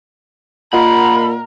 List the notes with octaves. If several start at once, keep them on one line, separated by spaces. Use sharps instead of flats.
A#2 F4 A#4 D#5 F#5 B5